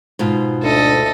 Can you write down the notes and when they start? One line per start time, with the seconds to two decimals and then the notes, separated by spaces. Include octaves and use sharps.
0.19 G#2 B2 F4
0.63 D2 D4 A4 D#5